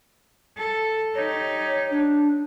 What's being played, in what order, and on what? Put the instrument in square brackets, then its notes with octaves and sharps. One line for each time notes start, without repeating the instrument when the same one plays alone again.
[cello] A4
[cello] D#4 G4 [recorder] C#5
[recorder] D4